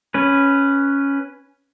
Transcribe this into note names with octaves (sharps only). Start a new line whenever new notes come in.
C#4 B4